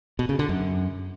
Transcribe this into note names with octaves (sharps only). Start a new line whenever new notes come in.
B2
C#3
D3
F#2